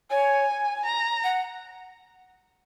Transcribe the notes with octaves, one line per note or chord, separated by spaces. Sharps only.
C#5 G#5
A#5
F#5